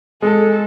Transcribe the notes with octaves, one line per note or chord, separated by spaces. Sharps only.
G#3 A4